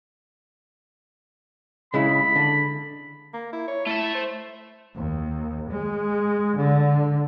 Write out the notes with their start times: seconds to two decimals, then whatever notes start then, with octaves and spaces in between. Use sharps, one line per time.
1.94 C#3 G#3 E4 B5
2.36 D3
3.34 A#3
3.53 E4
3.68 C#5
3.86 A3 E4 E5
4.15 C5
4.96 D#2
5.69 G#3
6.56 D3